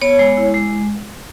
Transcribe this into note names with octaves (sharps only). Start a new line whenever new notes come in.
B3 C#5
G#3
E4
G#3